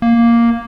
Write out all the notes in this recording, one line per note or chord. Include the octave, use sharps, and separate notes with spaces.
A#3